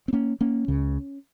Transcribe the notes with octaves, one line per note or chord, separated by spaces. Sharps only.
C4
A#3 C#4
A#3 C#4
C#2 C#3